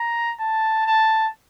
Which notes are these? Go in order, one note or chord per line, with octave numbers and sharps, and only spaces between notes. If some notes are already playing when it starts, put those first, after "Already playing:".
Already playing: A#5
A5
A5